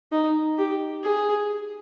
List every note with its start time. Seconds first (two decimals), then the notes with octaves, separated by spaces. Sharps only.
0.12 D#4
0.58 G4
1.04 G#4